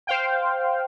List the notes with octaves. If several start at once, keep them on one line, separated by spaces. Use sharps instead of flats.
C5 F5 G5